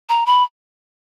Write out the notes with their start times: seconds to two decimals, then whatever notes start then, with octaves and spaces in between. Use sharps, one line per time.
0.09 A#5
0.26 B5